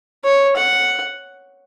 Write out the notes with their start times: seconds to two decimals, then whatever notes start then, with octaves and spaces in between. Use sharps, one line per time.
0.24 C#5
0.56 F#5